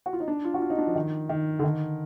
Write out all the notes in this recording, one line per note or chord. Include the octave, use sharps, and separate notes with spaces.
F#4
F4
D#4
D4
F4
F#4
F4
D#4
D4
F3
D#3
D#3
D3
D#3